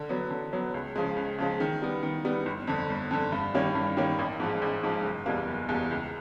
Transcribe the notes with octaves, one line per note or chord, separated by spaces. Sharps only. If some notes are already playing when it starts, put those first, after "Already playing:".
Already playing: D3
F#3 B3
D3
F#3 B3
C#2
C#3 F3 G#3
C#2
C#3 F3 G#3
D#3
G3 B3
D#3
G3 B3
G1
F2 D3
G1
F2 D3
G2
D#3 G3 A#3 C#4
G2
D#3 G3 A#3 C#4
A1
G#2 F3 G#3
A1
G#2 F3 G#3
F#1
E2 B2 G3 A#3
F#1
E2 B2 G3 A#3
C#2